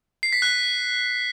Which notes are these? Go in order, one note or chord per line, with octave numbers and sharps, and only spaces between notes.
C7
B6
F#6